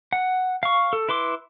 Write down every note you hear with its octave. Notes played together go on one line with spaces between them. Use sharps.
F#5
F5 C#6
A4
E4 B4 C6 D6